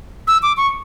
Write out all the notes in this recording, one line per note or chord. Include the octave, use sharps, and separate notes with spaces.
E6
D6
C#6